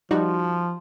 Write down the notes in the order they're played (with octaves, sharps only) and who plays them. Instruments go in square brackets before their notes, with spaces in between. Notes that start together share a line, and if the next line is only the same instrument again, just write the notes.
[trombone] F3 [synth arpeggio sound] G3 D#4 F#4